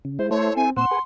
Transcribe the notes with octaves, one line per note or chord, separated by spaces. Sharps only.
C#3
G#3 E4 C5
A3 E4 A4 C5 C#5
C4 G#5
A#2 C4 F#5 C6 E6
G#4 B4 G#5